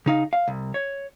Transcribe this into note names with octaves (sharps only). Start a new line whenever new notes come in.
C#3 D#4 F5
F5
C2
C#5